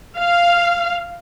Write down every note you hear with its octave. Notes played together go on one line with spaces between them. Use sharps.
F5